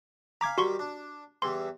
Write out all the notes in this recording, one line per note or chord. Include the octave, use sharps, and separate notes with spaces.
F5 G#5 A#5 B5 D6 G#6
D#3 G3 F#4 G4 C6 C#6
D4
E2 E3 G3 C6